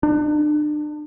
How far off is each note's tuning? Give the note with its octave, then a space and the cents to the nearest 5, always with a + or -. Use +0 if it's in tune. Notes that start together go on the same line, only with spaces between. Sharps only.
D4 +35